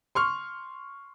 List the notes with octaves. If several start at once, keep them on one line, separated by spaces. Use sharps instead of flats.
C6 C#6 F6